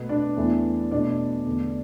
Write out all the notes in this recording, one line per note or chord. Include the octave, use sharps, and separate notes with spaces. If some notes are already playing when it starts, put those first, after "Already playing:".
Already playing: B2 A3 B3 B4
D4 D5
E2 E3 A3
B2 A3 D4 D5
E2 D3 A3